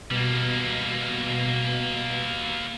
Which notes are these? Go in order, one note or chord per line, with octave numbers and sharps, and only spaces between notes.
B2 G3 A#3